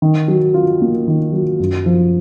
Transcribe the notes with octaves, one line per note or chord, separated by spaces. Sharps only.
D#3
F#3
F4
A#3
D#3
F#3
F#2
F3